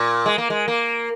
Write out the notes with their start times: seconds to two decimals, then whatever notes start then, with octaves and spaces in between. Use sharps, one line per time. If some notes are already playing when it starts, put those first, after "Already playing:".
Already playing: A#2
0.26 G#3
0.38 A#3
0.50 G#3
0.68 A#3